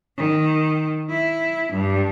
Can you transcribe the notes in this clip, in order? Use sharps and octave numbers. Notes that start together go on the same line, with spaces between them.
D#3
E4
G2